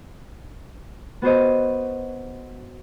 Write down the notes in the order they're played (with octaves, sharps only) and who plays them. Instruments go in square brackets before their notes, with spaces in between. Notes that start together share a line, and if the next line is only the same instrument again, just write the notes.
[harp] B3 F#4 C5 D#5